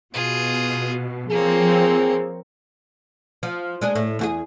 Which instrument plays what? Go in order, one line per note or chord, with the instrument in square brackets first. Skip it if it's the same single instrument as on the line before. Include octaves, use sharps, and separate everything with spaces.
[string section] B2 [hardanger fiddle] F4 G#4
[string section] F3 C4 [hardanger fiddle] A#3 C#5 [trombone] G#4
[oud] F3
G#3 D4 G#4
A2
E2 F#4 G#4